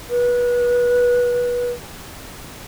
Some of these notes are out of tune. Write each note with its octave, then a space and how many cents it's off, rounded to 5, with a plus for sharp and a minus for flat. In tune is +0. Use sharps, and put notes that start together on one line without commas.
B4 -25